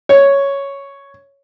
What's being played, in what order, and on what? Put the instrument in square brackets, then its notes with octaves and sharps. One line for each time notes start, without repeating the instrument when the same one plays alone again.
[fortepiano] C#5